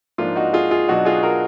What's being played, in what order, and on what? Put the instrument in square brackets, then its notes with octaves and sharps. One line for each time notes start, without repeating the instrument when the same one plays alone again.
[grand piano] G#2 F3 A#3 D4 F4
D#4 F#4
F4 G#4
F4 G#4
B2 F#3 D4 D#4 F#4
F4 G#4
F#4 A#4